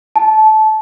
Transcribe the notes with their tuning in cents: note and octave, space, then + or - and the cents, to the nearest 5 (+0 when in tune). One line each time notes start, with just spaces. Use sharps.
A5 -20